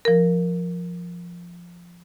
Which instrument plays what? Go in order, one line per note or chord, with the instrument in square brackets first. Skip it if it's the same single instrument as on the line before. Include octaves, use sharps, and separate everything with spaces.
[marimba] F3 A#4